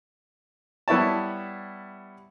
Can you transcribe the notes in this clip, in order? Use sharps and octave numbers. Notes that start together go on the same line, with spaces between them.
G3 B3 E4 C#5 A5